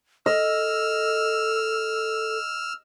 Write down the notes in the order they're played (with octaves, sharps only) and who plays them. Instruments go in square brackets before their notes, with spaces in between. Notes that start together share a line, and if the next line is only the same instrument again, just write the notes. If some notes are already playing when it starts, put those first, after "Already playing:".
[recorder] A4 [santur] D#5 [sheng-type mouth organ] E6 F6